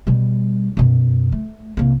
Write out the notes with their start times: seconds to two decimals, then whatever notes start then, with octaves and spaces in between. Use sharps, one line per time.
0.07 B2 G3
0.77 F#2 B2
1.32 A3
1.77 C2 A#3